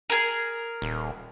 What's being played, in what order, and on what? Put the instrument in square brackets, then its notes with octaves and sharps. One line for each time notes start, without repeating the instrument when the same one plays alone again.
[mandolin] G#4 A#4
[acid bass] D#1